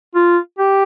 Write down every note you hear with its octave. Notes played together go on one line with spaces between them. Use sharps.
F4
G4